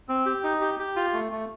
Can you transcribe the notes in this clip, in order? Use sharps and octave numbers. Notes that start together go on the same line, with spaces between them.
C4
G4
D#4
G4
G4
F4
A3
A3